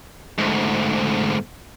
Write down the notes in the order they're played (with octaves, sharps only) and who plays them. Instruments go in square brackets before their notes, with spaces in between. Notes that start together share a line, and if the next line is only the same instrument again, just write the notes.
[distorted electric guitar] D2 G#2